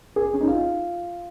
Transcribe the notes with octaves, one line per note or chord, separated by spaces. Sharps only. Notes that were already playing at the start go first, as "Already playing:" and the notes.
G#4
C#4
D#4
F4